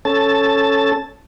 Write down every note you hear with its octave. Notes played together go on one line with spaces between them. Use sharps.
C#4 A4 A5